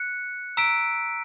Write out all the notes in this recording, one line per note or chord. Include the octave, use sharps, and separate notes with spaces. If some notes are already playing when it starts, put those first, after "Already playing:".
Already playing: F#6 C#7
A#5 E6 B6 D7